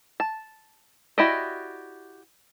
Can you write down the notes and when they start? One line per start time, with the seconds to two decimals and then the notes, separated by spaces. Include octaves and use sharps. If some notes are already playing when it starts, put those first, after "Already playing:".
0.20 A5
1.18 E4 F#4 G4 D5 D#5